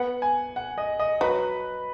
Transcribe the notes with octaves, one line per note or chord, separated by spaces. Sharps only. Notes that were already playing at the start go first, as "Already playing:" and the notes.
Already playing: B3 F#5
G#5
F#5
D#5
D#5
F#3 B4